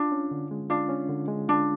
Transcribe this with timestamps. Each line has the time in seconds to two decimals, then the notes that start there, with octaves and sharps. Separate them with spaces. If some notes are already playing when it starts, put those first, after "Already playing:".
Already playing: D4 F4
0.12 C#4
0.31 D3
0.51 G#3
0.70 D4 F4
0.89 C#4
1.09 D3
1.28 G#3
1.48 D4 F4